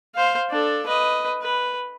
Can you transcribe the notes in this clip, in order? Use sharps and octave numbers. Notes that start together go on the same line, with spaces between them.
C5 F5
D4 A4
B4 D#5
B4